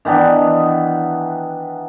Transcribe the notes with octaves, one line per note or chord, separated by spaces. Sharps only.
D#3 E3 B3 D4